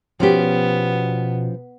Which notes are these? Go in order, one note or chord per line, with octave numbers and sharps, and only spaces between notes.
B2 F3 B3 C#4 G4